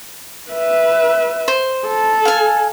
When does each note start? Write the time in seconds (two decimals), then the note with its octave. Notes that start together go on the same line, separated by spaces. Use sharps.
0.51 B4 E5
1.48 C5
1.87 A4
2.25 F5 G#5